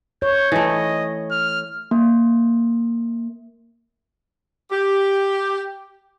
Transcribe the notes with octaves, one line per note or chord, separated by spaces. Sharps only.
C#5 G6
E3 A3 D#5
F6
A#3
G4